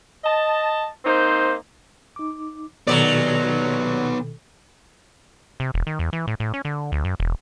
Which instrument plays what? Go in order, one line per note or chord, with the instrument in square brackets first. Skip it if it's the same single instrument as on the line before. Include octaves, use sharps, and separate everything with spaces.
[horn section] D#5 A5
A#3 C4 D#4 C5
[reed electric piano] D#4 D6
[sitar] D#2 F#3 D5 [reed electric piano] B2 D#3 A4 [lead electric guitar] B3 D#4
[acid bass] C3
E1
D#3
E2
E3
A2
A2
C#4
D3
D2
F#2
E1